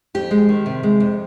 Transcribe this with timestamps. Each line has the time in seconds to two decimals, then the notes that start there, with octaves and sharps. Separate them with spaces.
0.15 F2 G4
0.31 G#3
0.49 D#3
0.66 C3
0.83 G#3
1.00 F2